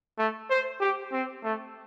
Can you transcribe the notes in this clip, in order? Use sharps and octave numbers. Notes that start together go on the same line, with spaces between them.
A3
C5
G4
C4
A3